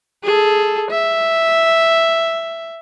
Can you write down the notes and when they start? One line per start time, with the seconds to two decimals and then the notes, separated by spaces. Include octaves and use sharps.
0.24 G#4 A4
0.91 E5